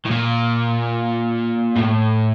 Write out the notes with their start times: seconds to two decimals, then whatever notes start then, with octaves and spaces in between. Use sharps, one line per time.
0.05 A2
0.11 A#2
1.76 A2